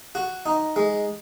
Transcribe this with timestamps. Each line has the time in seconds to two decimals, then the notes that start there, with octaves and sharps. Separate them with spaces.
0.15 F#4
0.46 D#4
0.76 G#3